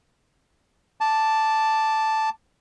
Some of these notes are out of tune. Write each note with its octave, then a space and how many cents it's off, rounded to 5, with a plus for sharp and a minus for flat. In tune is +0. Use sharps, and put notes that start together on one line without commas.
A5 +0 D6 +0